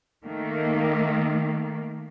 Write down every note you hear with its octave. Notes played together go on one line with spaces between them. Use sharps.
D#3 A3 A#3